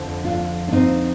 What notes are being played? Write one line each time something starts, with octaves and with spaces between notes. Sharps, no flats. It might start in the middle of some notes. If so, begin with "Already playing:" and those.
Already playing: F2 D3 F3
D4 F4
D4
C4 D#4